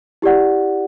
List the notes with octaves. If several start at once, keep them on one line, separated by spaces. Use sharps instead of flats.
E4 G4 D5 F#5